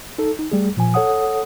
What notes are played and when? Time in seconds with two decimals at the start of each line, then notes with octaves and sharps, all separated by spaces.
0.18 D#4 A4
0.39 D#4
0.52 G3 A3 G#4
0.77 A#2 F3 G#5
0.94 A4 C#5 F#5 D#6